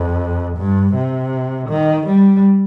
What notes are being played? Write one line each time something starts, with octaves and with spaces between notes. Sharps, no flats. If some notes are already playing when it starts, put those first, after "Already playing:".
Already playing: F2
G2
C3
D#3
G3